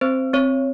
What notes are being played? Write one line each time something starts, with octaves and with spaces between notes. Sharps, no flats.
C4 C5
C4 C#5